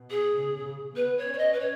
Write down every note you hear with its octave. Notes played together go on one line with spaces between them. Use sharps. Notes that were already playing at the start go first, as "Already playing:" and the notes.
Already playing: B2
G#4
C#3
C#3
B3 B4
C#5
C#4
C#5
D#5
B4
C#5